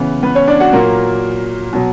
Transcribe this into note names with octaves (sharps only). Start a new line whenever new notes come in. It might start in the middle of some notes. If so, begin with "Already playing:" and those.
Already playing: C#3 E3 B3
B3 B4
C#4 C#5
D4 D5
F#4 F#5
A#2 F#3 A#3 A#4
B2 F#3